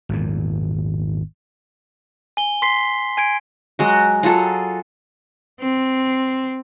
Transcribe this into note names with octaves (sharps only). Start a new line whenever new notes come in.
G#1 E2 A#2
G#5 G7
C6 B6 C7
G#5 G#6 D7
F#3 G#3 F#4
F#3 F4 G#4 A4
C4